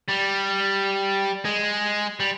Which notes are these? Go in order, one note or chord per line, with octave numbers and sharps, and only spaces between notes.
G3
G#3
G3